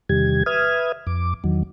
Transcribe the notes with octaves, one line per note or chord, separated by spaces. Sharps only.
E2 C3 D#3 G3 G4 G#6
B4 E5 D#6 F6 G#6
F2 D6
E2 D#3 F#3